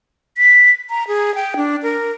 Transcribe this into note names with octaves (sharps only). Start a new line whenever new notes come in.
B6
A#5
G#4
G5
D4
A#4